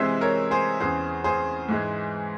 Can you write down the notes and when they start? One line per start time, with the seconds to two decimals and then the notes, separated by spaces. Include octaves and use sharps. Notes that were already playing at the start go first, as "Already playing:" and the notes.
Already playing: C3 E3 G#3 C5 E5
0.21 A#4 C#5
0.51 G#4 C5
0.80 E2 C#3 E3 G#4 C5
1.24 G#4 C5
1.68 G#2 E3 G#3